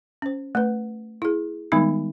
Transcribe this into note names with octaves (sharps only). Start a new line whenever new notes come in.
C#4 C5
A3 B4
E4 G#4
D#3 G3 G#3 B3 D#4